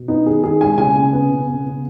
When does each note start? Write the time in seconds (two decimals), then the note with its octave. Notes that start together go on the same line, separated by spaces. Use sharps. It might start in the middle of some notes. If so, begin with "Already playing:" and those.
Already playing: B2
0.08 B3 D#4
0.26 D#3 G#4
0.43 D#3 G#4
0.61 G#3 G#5
0.78 C#3 G#5
0.96 C#3
1.13 B3
1.31 C#3
1.48 B3
1.66 C#3